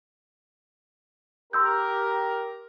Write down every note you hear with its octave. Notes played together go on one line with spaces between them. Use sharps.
G4 A#4 C6 E6 G6